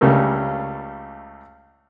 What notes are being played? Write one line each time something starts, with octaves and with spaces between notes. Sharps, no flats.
C#2 C#3 G3 A3 A#4